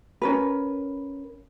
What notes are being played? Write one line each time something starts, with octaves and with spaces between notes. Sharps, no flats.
C#4 A#4 B4